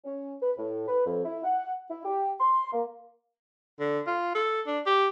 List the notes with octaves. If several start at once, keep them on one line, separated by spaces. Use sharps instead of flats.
C#4
B4
A2
B4
F2
E4
F#5
E4
G4
C6
A#3
D3
F4
A4
D4
G4